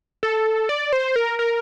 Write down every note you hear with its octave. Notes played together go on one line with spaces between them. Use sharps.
A4
D5
C5
A#4
A#4